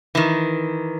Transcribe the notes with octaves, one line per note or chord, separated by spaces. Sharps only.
D#3 E3